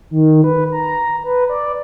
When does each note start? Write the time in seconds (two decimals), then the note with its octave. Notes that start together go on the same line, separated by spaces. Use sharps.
0.11 D#3
0.44 B4
0.72 A#5
1.24 B4
1.49 D5